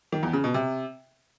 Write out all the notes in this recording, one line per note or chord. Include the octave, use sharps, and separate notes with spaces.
D#3
E2
C#3
B2
C3